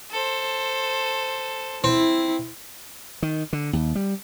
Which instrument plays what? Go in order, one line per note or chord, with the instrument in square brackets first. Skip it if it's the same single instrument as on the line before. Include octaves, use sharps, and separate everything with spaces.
[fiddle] A4 C5
[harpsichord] C4 [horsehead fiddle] E4
[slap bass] D#3
D3
D#2
G3